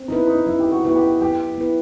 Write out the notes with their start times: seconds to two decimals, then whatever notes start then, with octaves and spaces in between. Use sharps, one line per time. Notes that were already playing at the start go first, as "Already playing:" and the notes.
Already playing: C4
0.08 B3 D#4 E4 B4
0.27 D#4
0.46 F#3 E4
0.60 G4
0.72 F#4
0.84 B3 E4 F#4 B4
0.96 G4
1.21 F#3 G4
1.58 B3 E4 B4